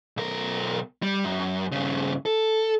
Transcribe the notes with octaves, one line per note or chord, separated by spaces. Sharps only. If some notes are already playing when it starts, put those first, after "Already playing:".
B1 A#4
G3
F#2
G2 C#3
A4